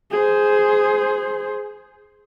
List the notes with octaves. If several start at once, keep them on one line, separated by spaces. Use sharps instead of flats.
G#4 C5